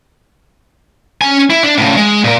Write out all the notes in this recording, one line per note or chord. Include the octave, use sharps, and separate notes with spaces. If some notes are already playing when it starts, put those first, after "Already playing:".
C#4 G#5
E4
D4
A2 C#3
G#3
A#2 A#4